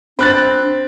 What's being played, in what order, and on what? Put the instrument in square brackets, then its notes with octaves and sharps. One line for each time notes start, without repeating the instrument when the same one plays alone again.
[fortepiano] C4 [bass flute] D4 [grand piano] B5 F#6 A6